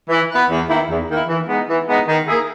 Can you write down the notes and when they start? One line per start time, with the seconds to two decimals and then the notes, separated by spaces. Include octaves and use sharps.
0.09 E3
0.30 B3 E4 B4
0.50 E2
0.69 D#3 A#3 E4
0.89 E2
1.08 D#3 A#3 E4
1.29 E3
1.48 G#3 B3 D#4
1.68 E3
1.88 G#3 B3 D#4
2.07 D#3
2.27 A#3 E4 G#4